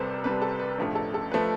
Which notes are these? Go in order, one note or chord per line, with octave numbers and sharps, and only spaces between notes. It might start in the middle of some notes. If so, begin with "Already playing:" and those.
Already playing: C2 C3 G3 A4 B4 C5
C2 C3 G3 B4
A4
B4
A1 G2 F3 A3
A4
A4
F3 A3 B4